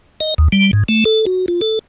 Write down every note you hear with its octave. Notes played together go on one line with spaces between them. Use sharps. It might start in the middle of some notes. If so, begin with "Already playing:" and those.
D#5
D#2
G3
G#2
A3
A4
F#4
F4
A4